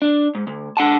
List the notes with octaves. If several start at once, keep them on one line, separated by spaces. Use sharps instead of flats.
D4
G#2
D2
C#2 D4 F#5 A5